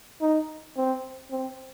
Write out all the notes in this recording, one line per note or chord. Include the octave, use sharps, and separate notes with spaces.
D#4
C4
C4